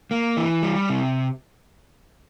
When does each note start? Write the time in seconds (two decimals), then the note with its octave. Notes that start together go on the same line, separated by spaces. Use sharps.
0.11 A#3
0.37 E3
0.63 G3
0.90 C3